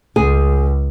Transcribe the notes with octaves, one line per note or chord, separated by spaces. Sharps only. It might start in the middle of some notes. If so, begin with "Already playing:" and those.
C#2 G#4